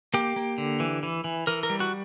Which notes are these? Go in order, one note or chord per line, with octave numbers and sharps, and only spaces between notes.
A#3 G4
A#3
D3
E3
E3
E3
E3 A#4
A#4
G3
F#4